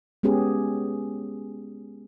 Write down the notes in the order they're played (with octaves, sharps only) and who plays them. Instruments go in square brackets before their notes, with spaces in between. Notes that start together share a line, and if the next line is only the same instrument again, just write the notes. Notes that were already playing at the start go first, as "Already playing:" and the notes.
[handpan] G#3 B3 C#4 G4 G#4